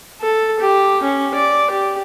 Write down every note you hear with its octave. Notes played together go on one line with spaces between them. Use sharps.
A4
G4
C#4
D5
G4